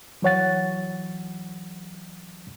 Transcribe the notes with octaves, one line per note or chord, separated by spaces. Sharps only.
E3 F#3 C#5 F#5 A6